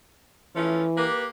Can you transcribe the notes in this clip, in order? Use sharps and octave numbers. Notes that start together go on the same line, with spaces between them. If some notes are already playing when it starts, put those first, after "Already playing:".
E3 F3 A3 C#4
A#3 G4 B4